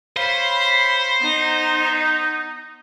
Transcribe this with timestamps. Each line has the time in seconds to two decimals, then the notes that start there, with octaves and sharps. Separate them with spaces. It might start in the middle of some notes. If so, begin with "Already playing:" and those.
0.17 C5 C#5 F5 B5
1.21 B3 D#4